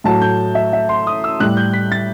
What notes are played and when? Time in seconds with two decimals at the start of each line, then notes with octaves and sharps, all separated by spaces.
0.04 A2 F#3 A3 A5
0.22 G6
0.55 E5
0.73 E5
0.89 C6
1.07 D#6
1.24 E6
1.40 A2 G3 F#6
1.57 G6
1.73 B6
1.92 A6